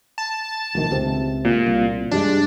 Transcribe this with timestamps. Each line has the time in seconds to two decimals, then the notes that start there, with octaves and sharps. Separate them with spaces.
0.18 A5
0.75 E1 D2 D#3
0.91 C#2 C3 C4
1.45 A#2
1.66 C2
2.11 G2 G3 G#3 D4